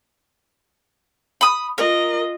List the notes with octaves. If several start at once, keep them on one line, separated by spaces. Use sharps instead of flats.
B5 D#6
F4 A#4 D#5